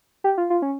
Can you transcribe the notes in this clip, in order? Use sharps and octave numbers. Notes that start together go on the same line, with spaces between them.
G4
F4
F4
C#4